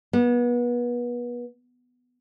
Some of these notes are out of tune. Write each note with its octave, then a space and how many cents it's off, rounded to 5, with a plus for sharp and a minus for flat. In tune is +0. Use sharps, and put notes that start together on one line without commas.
B3 -30